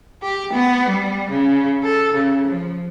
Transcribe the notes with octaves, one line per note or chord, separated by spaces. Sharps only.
G4
B3
G3
C#3
A4
C#3
F3